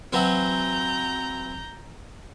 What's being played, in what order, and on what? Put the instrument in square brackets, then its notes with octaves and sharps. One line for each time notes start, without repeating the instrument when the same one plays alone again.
[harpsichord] E3 F#3 C4 [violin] A#5 G6